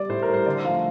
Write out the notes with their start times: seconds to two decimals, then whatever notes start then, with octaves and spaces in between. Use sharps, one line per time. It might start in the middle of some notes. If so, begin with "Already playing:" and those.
Already playing: G3 D5
0.09 A2 C5
0.22 A#4
0.28 G3
0.34 C5
0.46 D3 D5
0.64 F3 F5
0.68 A3